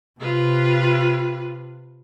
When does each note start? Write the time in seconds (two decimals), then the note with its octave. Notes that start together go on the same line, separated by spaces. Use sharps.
0.20 C3 F4 B4